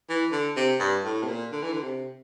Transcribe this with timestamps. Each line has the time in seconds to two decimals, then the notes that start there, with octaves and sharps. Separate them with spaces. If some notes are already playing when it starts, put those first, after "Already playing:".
0.09 E3
0.32 D3
0.56 C3
0.80 G2
1.04 A2
1.23 C3
1.27 A#2
1.52 D3
1.62 E3
1.72 D3
1.83 C3